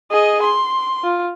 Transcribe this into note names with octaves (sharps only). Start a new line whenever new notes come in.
G#4 D#5
C6
F4